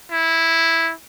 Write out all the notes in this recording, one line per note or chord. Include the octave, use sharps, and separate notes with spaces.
E4